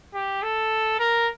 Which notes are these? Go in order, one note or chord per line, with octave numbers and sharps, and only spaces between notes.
G4
A4
A#4